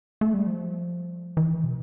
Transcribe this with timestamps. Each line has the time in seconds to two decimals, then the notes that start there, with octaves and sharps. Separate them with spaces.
0.21 A3
0.34 G3
0.47 F3
1.37 E3
1.64 B2